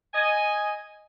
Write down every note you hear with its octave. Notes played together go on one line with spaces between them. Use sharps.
D#5 G#5